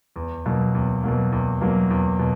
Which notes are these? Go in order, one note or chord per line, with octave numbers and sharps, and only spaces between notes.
E2
B2 F#3 A#3
E2
B2 F#3 A#3
E2
B2 F#3 A#3
E2
B2